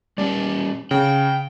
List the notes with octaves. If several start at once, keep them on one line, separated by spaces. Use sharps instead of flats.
G3 C#4 G4 D5
C#3 G5